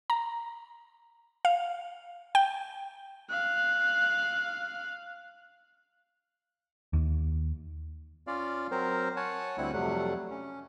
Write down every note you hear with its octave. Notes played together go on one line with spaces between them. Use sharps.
A#5
F5
G5
F5 F#6
D#2
C#4 F4 D5 F5
F#3 C4 A#4 C5
C#5 F#5 G#5 A5
D2 G3 C4 E4 F#5 F#6
F2 C3 F#3 G3 A3 F#5
C#4